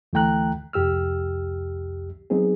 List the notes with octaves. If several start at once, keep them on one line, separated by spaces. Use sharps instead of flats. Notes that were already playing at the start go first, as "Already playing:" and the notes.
D2 E3 A3 G5 A#5 F#6
C2 F2 G4 E6 F6
F#3 B3 C4 D#4 G#4